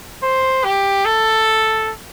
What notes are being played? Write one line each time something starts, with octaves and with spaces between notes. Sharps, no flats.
C5
G4
A4